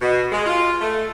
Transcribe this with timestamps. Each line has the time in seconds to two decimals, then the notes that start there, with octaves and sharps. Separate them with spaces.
0.02 B2
0.32 G#3
0.46 F4
0.81 A3